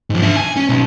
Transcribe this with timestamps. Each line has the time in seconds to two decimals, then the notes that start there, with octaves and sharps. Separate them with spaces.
0.10 G#2 F3
0.22 D4 E5
0.36 G#5
0.57 C#4
0.69 B1